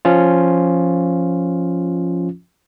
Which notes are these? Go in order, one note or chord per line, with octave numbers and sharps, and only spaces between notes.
F3 C#4 F4